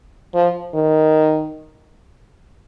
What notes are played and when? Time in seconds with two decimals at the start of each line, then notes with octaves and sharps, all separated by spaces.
0.35 F3
0.74 D#3